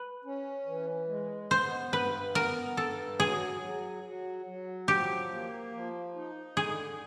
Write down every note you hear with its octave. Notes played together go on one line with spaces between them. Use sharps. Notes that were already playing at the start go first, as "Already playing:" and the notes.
Already playing: B4
C#4
E3
G#3
B3 C5
G2 B4
B3 A#4
G2 A4
F#3 G#4
F#3
F#3
F#3
F3 G4
A#3
F3
D#4
D3 G#4